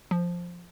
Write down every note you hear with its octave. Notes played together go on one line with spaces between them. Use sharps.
F3